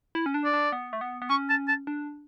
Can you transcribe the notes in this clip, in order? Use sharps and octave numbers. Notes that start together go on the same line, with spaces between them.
E4
C#4
D4
D5
D4
B3
A3
B3
B3
C#4 C#6
A5
A5
D4